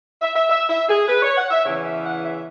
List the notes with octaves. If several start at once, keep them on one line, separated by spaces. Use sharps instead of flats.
E5
E5
E5
E5
G#4
B4
C#5
F#5
E5
E2 C#3 E3 C#4 C#5
E5
F#5
E5